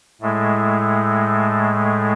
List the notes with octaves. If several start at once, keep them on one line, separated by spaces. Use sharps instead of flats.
A2 G#3 A3
A3